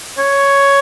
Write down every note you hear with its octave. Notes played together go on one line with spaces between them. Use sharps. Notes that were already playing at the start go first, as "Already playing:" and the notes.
C#5